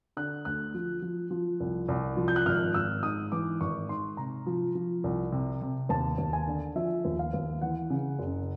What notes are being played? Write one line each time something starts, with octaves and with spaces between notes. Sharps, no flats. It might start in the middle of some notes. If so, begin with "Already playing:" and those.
D3 F#6
D2 F#6
F3
F3
F3
C2
C2
F3
G6
F#6
G#1 F6
G#1 E6
G#2 D#6
E3 D6
G#1 C#6
G#2 C6
C3 A#5
F3
F3
C2
C3
C3
D#2 A5
D#2
G#5
D3
F3 E5
D#2
F5
D#2
E3 F#5
C#3
F#1